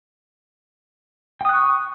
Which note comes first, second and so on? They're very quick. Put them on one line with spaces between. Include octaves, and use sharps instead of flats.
G5 D#6 F#6 C#6